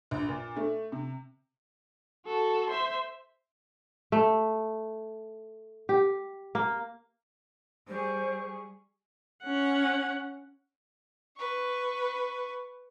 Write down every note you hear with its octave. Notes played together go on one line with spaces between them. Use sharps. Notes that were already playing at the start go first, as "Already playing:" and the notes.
A#1
A#2
A3
C3
F#4 A4
C5 E5
A3
G4
A#3
G3 G#4 C5 C#6
C#4 F#5
B4 C#6